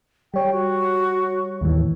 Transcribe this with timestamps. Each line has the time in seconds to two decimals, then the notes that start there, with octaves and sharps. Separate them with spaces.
0.34 G3 C#5 G5
0.52 F#4
1.61 D#2 A2 E3